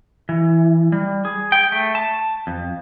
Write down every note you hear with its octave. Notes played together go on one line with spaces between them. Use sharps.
E3
G3
G#4
G5
A3
A5
F2